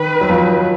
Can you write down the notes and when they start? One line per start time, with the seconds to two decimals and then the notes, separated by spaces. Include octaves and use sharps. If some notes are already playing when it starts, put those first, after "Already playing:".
Already playing: D#3 B4
0.21 F#3
0.30 F3